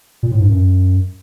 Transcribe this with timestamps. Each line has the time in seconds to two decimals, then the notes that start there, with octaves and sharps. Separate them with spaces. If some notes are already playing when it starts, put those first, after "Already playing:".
0.23 A#2
0.31 A2
0.40 G2
0.49 F#2